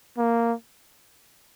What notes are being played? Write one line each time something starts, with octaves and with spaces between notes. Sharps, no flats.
A#3